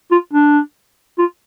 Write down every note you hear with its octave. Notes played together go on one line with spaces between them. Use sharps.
F4
D4
F4